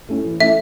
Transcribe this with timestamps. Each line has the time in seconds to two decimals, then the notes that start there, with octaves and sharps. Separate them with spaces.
0.09 A3 C#4 E4
0.24 E3
0.40 A3 C#4 E4 E5